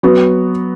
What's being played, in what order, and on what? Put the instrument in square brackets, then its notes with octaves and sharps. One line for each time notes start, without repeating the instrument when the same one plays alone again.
[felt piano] F#3 B3 F#4